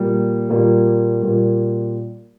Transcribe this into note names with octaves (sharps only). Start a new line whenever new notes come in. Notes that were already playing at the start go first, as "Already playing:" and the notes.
Already playing: A#2 G3 A#3
A#2 G3 A#3
A#2 G3 A#3